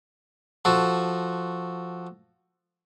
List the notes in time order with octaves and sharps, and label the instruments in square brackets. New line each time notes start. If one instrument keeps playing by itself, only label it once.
[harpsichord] F3 F#4 A4